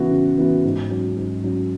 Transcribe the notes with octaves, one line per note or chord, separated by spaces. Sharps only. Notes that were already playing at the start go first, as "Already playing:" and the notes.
Already playing: C#3 E3 B3 F#4
C#3
E3 B3 F#4
G#2
F#3 C#4
G#2
F#3 C#4